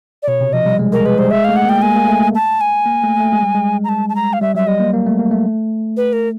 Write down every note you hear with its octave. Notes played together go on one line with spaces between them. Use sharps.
D5
B2 C#5
C3
F3 D#5
G3
G#3
G#3 A#4
G#3 B4
G3 C5
G#3 E5
A3 F5
F#5
A#3 G5
A#3 G#5
A#3
A3
A5
G#5
A#3
A3
A3
G#3
G3
G#3
A#5
A5
A5
A#5
F5
G3 E5
F#3 E5
G3 D#5
A#3
A#3
A3
A#3
A3
B4
A#4